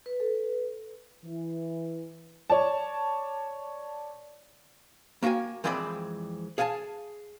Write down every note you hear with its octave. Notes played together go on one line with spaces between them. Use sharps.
B4
A4
E3
C#5 D5 A5
A#3 F#4 F5 G5 G#5
F2 E3 G#3 C4 D5 B5
G#4 F5 F#5 G#5 A5